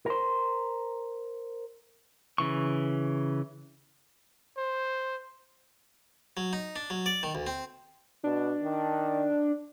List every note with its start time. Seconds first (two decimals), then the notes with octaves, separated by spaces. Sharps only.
0.06 A#4 C5
2.38 C#3 E3 C#6
4.57 C5
6.37 F#3
6.53 D#4
6.76 D4
6.90 F#3
7.06 D5
7.23 D#3
7.35 D2
7.47 C4
8.24 B2 D4
8.63 D#3